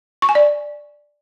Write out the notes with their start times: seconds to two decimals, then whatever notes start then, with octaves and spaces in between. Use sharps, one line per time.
0.22 C#6
0.29 G#5
0.35 D5